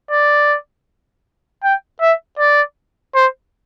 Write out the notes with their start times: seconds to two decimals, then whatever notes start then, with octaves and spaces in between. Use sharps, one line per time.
0.11 D5
1.63 G5
2.01 E5
2.39 D5
3.15 C5